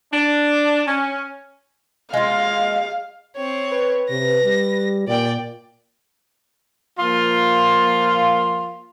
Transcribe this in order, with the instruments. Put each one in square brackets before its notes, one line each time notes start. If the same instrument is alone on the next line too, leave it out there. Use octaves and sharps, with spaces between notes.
[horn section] D4
C#4
[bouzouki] G#3 F4 [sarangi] F5
[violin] C4 C#5
[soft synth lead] B4
[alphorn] C3 [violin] A#6
[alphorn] G3
[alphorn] A#2 [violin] D5 G5
[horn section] F3 A#3 F4